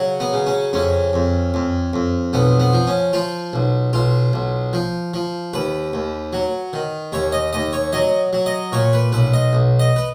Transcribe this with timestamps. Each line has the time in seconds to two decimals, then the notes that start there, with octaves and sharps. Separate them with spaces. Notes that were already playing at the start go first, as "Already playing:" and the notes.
Already playing: C#3 F#3
0.20 B3
0.33 C#3
0.47 C#4
0.73 F2 C#4
1.13 F2
1.54 F2
1.93 F2
2.33 B1 B3
2.60 B3
2.73 F3
2.87 C#4
3.13 F3 F4
3.53 B1
3.93 B1 F4
4.33 B1
4.73 F3
5.14 F3
5.54 D#2 B4
5.93 D#2
6.33 F#3
6.73 D#3
7.12 D#2 C#5
7.32 D#5
7.53 D#2 D#5
7.73 C#5
7.93 F#3 D#5
8.33 F#3
8.46 D#5
8.72 A#2 C#5
8.93 B4
9.12 B1 B4
9.34 D#5
9.53 B1
9.80 D#5
9.96 B4